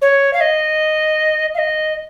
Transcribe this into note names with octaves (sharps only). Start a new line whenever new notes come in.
C#5
F5
D#5
F5
D#5